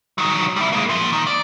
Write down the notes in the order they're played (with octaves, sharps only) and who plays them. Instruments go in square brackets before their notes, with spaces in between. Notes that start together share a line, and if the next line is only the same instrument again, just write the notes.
[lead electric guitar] D#3 F#3
G3 E4
G#3 A#3
A#2 F3
D#3
D5